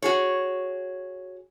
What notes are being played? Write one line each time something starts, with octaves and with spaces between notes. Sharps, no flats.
F#4 G#4 C#5